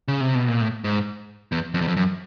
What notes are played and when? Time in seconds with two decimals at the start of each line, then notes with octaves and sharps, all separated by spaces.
0.08 C#3
0.21 C3
0.35 B2
0.48 A#2
0.61 A2
0.84 G#2
1.52 E2
1.74 F2
1.81 E2
1.88 F2
1.97 F#2